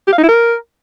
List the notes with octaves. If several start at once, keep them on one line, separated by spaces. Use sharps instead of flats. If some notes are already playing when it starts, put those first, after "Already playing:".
G4
F5
D#4
E4
A#4